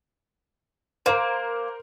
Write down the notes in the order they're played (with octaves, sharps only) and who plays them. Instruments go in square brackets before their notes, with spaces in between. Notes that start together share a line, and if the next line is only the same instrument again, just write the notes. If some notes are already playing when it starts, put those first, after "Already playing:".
[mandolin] A#3 [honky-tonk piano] A#4 C5